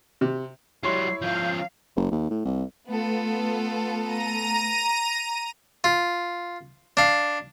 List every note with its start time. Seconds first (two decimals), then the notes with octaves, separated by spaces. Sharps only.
0.21 C3
0.83 F#3 G3 E4 C#5 C6 C7
1.22 F3 C#4 F5 G6
1.96 F#1
2.11 D#2
2.30 A2
2.45 C2
2.89 A3 B3 F4 A4
4.03 A#5 D#7
5.84 F4
6.97 D4 F5